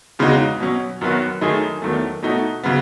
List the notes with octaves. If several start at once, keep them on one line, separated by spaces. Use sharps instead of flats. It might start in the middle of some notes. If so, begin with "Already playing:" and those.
E2 C#3 G#3 D#4 F#4
B2 F#3 C#4
F#2 D#3 F#3 B3 F#4
F#2 D#3 A3 D#4 G#4
E2 D#3 F#3 A3
B2 A3 D#4 F#4
C#3 F#3 B3